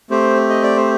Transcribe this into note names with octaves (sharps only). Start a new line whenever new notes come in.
A3 C4 G4 C5
D#5
D5
C5